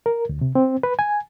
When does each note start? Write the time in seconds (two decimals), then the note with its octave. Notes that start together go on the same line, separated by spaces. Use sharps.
0.06 A#4
0.29 D2
0.41 C3
0.55 C4
0.83 B4
0.99 G#5